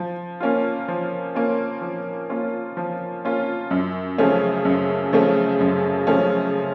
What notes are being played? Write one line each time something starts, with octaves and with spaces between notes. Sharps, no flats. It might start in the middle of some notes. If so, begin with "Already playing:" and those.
Already playing: F3
A#3 C#4 F4
F3
A#3 C#4 F4
F3
A#3 C#4 F4
F3
A#3 C#4 F4
F#2
C#3 F3 A3 C#4
F#2
C#3 F3 A3 C#4
F#2
C#3 F3 A3 C#4